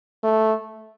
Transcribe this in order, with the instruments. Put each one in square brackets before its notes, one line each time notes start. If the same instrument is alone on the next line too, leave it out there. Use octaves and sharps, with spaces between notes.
[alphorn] A3